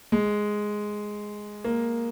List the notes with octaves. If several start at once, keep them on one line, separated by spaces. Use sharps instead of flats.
G#3
A#3